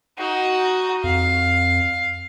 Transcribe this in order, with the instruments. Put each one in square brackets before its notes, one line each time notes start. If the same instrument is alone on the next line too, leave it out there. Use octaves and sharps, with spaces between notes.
[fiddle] D#4 F#4
[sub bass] F2 [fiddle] F5